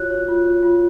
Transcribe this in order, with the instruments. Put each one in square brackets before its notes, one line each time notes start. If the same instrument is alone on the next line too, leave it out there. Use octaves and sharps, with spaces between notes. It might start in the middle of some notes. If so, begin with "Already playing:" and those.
Already playing: [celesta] F4 F#4 C#5 F#6
C#5
F4
C#5
F4